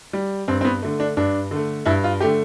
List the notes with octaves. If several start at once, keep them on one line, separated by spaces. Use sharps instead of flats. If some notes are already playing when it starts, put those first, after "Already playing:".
G3
G2 C4
C4
B3
D3 A3
D4
G2 D4
D3 A3
G2 E4
F4
D3 A3 G4